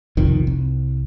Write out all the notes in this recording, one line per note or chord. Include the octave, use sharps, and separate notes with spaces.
B1 F2 C3 D#3
C2